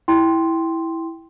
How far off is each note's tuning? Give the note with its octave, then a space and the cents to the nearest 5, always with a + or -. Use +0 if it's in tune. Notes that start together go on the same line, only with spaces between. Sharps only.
E4 -5 G5 +0 C6 +0